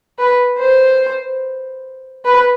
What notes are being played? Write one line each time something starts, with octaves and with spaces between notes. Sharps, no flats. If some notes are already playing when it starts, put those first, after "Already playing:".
B4
C5
B4